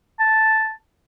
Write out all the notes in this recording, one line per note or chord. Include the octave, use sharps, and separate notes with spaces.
A5